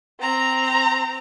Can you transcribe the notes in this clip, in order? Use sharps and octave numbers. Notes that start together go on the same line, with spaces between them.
C4 A#5